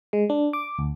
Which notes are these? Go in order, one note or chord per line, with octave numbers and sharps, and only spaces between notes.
G#3
D4
D6
D2